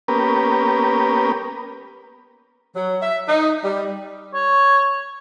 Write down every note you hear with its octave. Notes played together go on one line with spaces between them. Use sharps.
A#3 B3 C#4 G4 A#4 B4
F#3
E5
D#4
G3
C#5